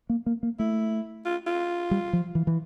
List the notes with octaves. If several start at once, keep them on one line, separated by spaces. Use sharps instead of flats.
A#3
A#3
A#3
A3 E4
F4
F4
G3
F3
E3
E3